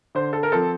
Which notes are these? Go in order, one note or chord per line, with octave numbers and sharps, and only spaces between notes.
D3 C5
A4
A#4
F3 C4 A4